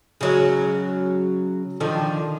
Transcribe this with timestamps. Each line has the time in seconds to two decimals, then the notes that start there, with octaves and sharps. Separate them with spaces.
0.21 C#3 F#3 G#3
1.80 D3 D#3 F3